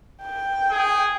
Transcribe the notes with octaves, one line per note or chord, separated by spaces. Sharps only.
G5
G#4